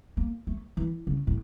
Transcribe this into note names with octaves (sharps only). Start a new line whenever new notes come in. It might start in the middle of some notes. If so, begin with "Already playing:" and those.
A#3
A3
E3
C#3
A2